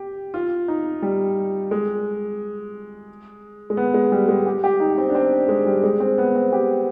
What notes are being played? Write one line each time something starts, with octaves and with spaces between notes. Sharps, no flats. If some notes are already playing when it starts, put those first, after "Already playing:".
Already playing: G4
F4
D#4
G3
G#3
G#3
B3
G#3
G3
G#3
G4
G4
D#4
C4
D4
C4
G#3
G3
G#3
C4
B3
C4
G4